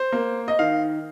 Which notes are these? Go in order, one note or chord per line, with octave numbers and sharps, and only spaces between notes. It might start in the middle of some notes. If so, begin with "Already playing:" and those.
Already playing: C5
A#3
D#5
D#3 F5